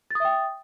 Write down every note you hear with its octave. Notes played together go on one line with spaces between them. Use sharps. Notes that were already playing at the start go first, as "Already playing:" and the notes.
E5 G5 D#6 A6